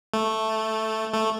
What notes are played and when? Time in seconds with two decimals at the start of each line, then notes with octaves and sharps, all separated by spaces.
0.14 A3
1.14 A3